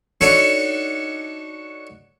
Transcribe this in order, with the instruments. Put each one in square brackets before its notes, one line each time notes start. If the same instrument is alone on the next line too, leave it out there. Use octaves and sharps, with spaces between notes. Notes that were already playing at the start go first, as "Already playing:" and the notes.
[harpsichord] D4 D#4 F#4 A4 C#5